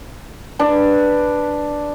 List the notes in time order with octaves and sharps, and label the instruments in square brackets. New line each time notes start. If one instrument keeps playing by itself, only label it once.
[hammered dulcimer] D4 B4